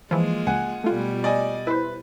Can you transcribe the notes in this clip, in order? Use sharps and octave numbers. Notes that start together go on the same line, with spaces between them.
E3 F3 G#3 A#3 F4
C#2 F#5 G#5
B2 G3 A3 F4
D5 D#5 G#5
E4 B4 C5